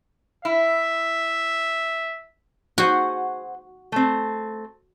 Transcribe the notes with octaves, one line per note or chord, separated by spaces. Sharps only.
E4 E5
F#4 G#4 C5 F#5
A3 C4